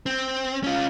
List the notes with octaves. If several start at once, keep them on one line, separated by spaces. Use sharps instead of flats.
C4
C#4 F4